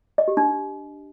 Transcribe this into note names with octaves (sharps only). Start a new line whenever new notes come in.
D#5
G4
D4